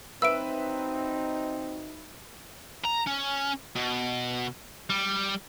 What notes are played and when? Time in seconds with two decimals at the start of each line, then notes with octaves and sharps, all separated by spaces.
0.22 F#3 C4 D#4 B4 E5 E6 D7
2.85 A#5
3.07 C#4
3.76 B2
4.90 G3